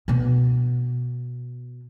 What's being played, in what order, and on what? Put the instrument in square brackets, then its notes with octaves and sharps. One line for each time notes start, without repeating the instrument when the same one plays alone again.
[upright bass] B2 B3